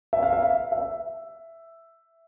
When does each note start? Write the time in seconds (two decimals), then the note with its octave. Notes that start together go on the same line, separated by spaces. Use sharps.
0.13 E5
0.23 F5
0.33 E5
0.42 F5
0.72 E5